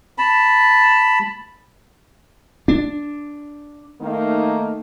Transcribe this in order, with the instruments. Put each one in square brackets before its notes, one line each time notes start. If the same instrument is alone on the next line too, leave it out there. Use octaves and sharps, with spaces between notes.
[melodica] A5 B5
[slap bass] D4
[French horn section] D#3 A3 A#3 D#4